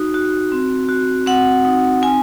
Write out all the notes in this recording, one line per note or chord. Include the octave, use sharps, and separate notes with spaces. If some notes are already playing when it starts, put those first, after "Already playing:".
Already playing: D#4 F#4
F#4
C4
F#4
C4 F#5
D#4
C4 G#5